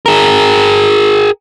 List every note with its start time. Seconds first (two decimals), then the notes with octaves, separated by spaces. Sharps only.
0.06 G#4 A#4